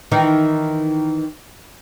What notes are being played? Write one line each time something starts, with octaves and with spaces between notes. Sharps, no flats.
D#3 E3 D#4